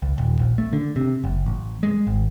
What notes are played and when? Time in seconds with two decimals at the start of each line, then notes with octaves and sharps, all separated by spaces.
0.02 C#2
0.18 D#1
0.39 A#1
0.58 A3
0.73 D3
0.96 C3
1.24 F#1
1.46 A1
1.83 G#3
2.07 G#1